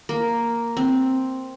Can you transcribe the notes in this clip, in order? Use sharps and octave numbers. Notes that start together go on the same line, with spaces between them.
A#3
C4